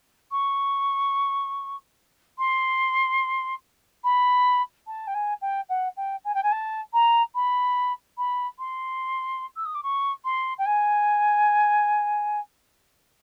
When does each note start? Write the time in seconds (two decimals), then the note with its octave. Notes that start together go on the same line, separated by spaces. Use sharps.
0.31 C#6
2.38 C6
4.04 B5
4.87 A5
5.07 G5
5.14 G#5
5.41 G5
5.69 F#5
5.97 G5
6.25 G#5
6.34 G5
6.43 G#5
6.52 A5
6.93 A#5
7.35 B5
8.18 B5
8.59 C6
9.56 E6
9.65 D#6
9.75 D6
9.83 C#6
10.25 C6
10.58 G5
10.66 G#5